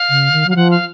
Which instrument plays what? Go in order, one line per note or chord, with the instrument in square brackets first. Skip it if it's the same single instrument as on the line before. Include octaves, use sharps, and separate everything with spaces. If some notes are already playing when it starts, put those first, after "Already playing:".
Already playing: [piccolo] F5
[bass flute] C#3
D#3
[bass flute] F#3 [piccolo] F5
[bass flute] F3 [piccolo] F#5
[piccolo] F5